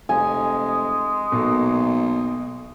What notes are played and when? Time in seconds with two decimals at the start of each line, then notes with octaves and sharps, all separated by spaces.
0.09 F1 G#3 G#5
1.32 B1 B2 A#3 A4